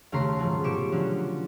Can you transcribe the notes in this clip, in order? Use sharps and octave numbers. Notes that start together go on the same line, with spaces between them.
D#2 C#3 A3 C#4 A#5 C6
G#2 F3 F#3
B2 G4 C#6 D6 E7
D3 F3 F#3 C#4